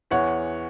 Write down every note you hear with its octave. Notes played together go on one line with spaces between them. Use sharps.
E2 E3 C#5 F#5